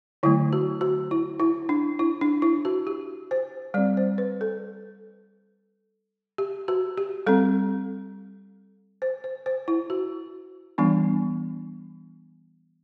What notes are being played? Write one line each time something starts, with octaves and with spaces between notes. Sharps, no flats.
D3 F#3 A3 E4
F#4
F#4
E4
E4
D4
E4
D4
E4
F#4
G4
C5
G3 C4 D5
C5
B4
A4
G4
F#4
G4
G3 C4 A4
C5
C5
C5
E4
F#4
E3 G3 B3 D4